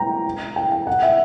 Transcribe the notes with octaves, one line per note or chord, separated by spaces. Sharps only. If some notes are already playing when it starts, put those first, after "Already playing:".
Already playing: G5 A#5
G5
G5
F#5
E5